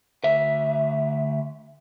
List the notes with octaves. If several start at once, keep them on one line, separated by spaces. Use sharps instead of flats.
D2 E5